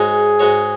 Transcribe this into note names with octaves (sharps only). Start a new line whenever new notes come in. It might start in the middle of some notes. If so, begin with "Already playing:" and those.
Already playing: G#2 G#3 F#4 G#4 C#5
G#2 G#3 F#4 C#5